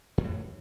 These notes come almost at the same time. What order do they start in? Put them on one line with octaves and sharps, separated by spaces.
F2 F#3 A2